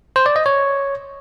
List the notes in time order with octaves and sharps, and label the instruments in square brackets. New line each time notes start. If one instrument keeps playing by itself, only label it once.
[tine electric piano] C5
D5
D#5
C#5